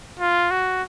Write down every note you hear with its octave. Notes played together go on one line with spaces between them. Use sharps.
F4
F#4